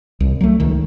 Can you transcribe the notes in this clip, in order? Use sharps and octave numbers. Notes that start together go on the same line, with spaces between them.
C2
F#3 A3
C#2 D#3